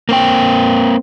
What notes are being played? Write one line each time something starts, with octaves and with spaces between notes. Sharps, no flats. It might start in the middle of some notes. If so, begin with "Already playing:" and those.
A#3 C4 G5